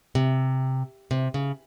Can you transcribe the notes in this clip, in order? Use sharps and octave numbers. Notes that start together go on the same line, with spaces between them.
C3
C3
C#3